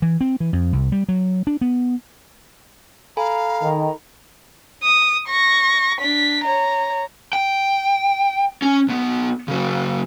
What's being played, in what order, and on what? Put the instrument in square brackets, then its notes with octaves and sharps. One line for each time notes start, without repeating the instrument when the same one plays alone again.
[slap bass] E3
C4
E3
F2
C2
G3
F#3
D4
B3
[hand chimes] A4 G#5 B5 [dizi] F5 [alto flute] A#5
[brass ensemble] D#3
[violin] D#6
C#6 A#6
D4 B6
C#5 A#5
[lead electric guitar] G5
C#4
B1 B3
C#3 F#3